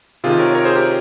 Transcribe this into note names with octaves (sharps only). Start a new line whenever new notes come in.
C3 D#3 F4 G#4
A#4 C#5
A#4 C#5
G#4 C5
G4 A#4